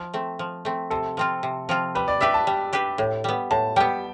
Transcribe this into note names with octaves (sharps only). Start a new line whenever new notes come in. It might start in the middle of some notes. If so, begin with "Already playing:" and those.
Already playing: F3
A3 C4
F3
A3 C4
C3 A4
F3 C4 F4
C3
F3 C4 F4
G3 B4
D5
D4 G4 B4 E5
A5
G3
D4 G4 B4
A2
G3 B3
A2 A5
G3 B3 G5